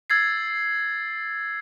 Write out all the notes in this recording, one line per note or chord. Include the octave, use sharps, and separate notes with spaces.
E6 G#6 A6 C7